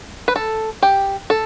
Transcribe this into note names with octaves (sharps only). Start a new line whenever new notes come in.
B4
A4
G4
A4